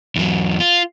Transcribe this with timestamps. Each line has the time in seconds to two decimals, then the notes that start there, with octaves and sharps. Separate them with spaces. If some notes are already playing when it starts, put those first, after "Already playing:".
0.16 E2 F#3
0.60 F4